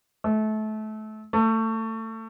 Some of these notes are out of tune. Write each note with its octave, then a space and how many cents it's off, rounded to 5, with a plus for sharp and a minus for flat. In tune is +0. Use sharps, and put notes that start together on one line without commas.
A3 -25
A3 +25